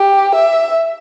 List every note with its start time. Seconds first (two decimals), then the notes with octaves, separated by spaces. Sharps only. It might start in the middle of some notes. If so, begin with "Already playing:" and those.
Already playing: G4
0.35 E5